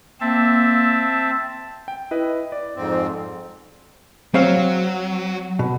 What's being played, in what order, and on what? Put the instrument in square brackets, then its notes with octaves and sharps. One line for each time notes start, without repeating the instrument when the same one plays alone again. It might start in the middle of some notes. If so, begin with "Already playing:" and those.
[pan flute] A#3 [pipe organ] C4 E5 A5
[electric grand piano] G5
E4 B4 D#5
D5
[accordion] F2 G#2 C4
[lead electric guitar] F#3 [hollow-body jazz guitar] C4 C#5 F5
[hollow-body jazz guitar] B2